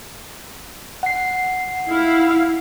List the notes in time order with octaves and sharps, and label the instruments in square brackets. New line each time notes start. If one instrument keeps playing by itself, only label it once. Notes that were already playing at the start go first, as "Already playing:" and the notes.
[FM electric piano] F#5 C7
[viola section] E4 F5